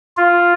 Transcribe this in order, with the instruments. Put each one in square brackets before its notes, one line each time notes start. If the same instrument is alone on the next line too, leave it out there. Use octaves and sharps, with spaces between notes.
[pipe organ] F4